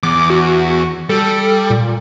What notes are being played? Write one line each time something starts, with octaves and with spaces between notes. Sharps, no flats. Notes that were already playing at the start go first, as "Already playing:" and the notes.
E2 D6
F#4
G3 A4
A#2